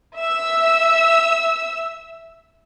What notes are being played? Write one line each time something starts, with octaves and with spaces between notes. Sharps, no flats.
E5 E6